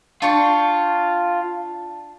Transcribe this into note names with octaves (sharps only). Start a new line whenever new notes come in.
D4 F4 G5 C#6